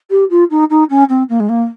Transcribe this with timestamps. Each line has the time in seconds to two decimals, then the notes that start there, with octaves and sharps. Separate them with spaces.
0.10 G4
0.30 F4
0.50 D#4
0.70 D#4
0.90 C#4
1.09 C4
1.29 A#3
1.39 G#3
1.49 A#3